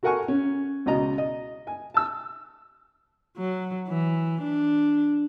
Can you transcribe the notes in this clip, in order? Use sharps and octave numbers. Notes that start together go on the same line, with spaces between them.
F#4 A4 A#4 F#5 G#5 C#6
C#4
C#2 B2 D#5 A#5
D#5
G#5
A5 E6
F#3
E3
D4